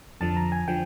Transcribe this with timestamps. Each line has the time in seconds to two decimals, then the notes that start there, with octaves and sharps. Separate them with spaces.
0.21 F2 D3 F3 A5
0.37 A#5
0.52 G#5
0.68 D3 F3 G5